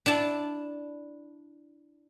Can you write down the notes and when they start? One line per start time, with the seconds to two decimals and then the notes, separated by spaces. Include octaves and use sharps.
0.06 D4 E4 A5